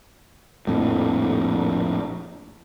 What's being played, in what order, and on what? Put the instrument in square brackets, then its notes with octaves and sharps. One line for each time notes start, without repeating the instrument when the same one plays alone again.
[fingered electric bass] A#1 F2 A2